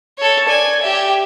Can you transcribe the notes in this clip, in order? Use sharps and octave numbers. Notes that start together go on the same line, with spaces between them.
A4 C#5
D5 G#5
G4 E5